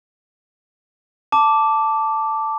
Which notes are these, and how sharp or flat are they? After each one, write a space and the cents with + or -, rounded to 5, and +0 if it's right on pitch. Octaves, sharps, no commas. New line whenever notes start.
A5 +5 D6 -5